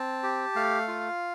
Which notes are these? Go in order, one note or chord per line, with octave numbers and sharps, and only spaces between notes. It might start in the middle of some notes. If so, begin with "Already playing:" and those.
Already playing: C4 A5
G4
A3 F5
F4